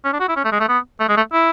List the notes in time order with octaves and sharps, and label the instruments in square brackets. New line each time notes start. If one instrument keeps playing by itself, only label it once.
[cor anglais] C#4
D4
F#4
E4
C#4
A3
G#3
A3
B3
A3
G#3
A3
E4